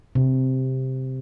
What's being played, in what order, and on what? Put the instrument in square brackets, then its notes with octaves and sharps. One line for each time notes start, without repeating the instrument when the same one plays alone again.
[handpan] C3